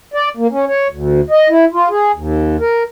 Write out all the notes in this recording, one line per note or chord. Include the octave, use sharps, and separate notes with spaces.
D5
A#3
C#4
C#5
D2
D#5
E4
F4
G#4
D#2
A#4